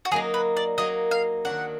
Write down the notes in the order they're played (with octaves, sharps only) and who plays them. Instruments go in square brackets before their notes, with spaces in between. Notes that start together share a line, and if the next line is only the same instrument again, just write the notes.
[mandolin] F#4
[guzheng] F#3 A#3 D#4 [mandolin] G#4
[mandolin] B4
D5
[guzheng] F#3 A#3 D#4 [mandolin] D#5
[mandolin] F5
[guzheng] D#3 F#3 D4 [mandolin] F#5